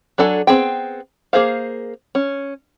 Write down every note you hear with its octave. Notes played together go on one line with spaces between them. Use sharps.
F#3 D4 A4 G#5
B3 C4 G#4 G5
A#3 G#4 C5 F5
C#4